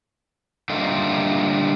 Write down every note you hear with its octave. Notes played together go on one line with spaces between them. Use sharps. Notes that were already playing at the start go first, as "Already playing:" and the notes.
D3 G3 A3 A#3 D#4 F4